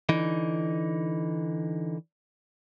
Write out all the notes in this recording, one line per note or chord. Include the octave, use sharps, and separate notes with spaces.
D3 E3 D#4